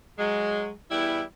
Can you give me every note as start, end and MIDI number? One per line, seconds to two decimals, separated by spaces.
0.18 0.71 54
0.18 0.71 56
0.90 1.22 40
0.90 1.22 55
0.90 1.22 64